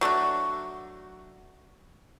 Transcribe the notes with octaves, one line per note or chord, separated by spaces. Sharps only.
F#3 A3 D4 F#4